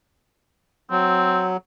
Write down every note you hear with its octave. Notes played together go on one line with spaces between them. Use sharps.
F#3 C4